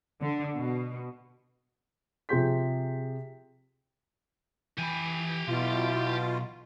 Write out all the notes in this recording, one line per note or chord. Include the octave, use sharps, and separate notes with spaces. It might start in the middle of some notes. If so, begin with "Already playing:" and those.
D3
B2
C3 F3 G#4 C6 G6 B6
E3 G4 G#5 B5
B1 B2 E4 F4